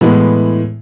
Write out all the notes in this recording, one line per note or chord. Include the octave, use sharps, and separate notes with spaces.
A2 E3 G#3 B3